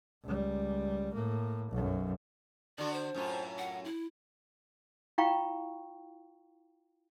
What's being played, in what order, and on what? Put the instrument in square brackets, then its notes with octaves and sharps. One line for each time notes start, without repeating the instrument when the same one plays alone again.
[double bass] C#2 G3
A2 A#3
B1 F#2
[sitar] D3 D4 F#4 [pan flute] D5
[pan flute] C5
[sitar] F#2 A2 F4
[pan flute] F#5
E4
[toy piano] E4 F4 F5 G5 A#5 C#6